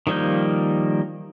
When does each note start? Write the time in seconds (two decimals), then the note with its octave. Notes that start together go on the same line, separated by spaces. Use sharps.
0.07 D#3 F3 G3 A#3 G6